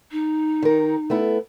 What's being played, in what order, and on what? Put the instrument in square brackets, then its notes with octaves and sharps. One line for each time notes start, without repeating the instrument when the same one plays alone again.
[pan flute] D#4
[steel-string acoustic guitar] D#3 A#4
A3 B3 E4